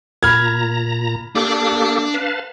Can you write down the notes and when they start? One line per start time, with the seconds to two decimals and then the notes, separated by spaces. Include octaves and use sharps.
0.23 A#2 A#5 B5 F6 G#6
1.35 A#3 D4 G4 A4 D5
2.14 B4 F5 A5